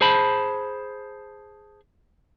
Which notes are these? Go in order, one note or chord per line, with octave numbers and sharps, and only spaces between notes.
G#4 C5 A5 B5